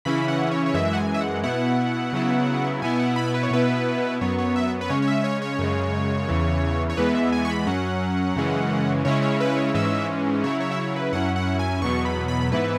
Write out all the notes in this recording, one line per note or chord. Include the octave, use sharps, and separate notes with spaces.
C#3 E3 C#4 E4 B5
F#5
C#5
C#5
F#2 E3 G#3 E5
F#5
G#5
E5
F#5
B2 B3 E4 F#5
C#3 F#3 B3 E4
B2 B3 E4 G#5
F#5
B5
B4
C#5
B2 B3 E4 B4
F#2 F#3 B3 C#5
C#5
E5
B4
C#3 G#3 C#4 C#5
C#5
E5
C#5
C#5
F#2 C#3 G#3
E2 C#3 E3
C#5
E2 E3 G#3 B3 B4
E5
G#5
C#6
B5
F#2 F#3 C#4 F#5
F#2 C#3 E3 G#3 C#4
C#3 G#3 C#4 E4 C#5
C#5
B4
C#5
G#2 E3 G#3 C#4 E5
C#3 F#3 E4 C#5
C#5
E5
C#5
B4
F#2 F#3 C#4 E4 F#5
F#5
G#5
E2 B2 F#3 B3 C#6
B5
B5
G#2 E3 B3 E4 B4